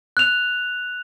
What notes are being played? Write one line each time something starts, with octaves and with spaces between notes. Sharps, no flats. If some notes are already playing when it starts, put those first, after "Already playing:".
F#6 F7